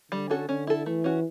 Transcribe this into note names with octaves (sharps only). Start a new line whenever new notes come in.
D3 G3
C#4 F#4 A4
D3 C#4
E4 A4
E3 A3
C#4 F#4